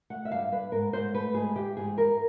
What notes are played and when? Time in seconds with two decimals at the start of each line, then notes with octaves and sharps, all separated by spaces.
0.10 A3 F#5
0.25 E5
0.31 G2 F5
0.52 G2 B4
0.72 G#2 A#4
0.93 G#2 C5
1.14 A3 B4
1.34 G#2 G#4
1.56 E3 G4
1.77 G#2 G#4
1.97 E3 A#4